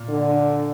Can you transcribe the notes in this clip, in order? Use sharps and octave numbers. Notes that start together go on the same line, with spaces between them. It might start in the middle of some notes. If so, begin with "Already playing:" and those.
Already playing: A#2
D3